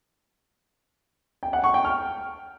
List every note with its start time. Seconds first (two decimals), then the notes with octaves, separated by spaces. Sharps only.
1.43 G5
1.53 F#5
1.64 C#6
1.74 G5
1.85 F6